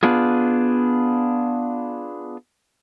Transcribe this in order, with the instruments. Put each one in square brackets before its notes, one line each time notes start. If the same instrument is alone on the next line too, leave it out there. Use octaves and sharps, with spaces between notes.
[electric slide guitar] B3 D4 F4 G#4